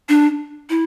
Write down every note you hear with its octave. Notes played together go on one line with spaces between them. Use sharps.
D4
E4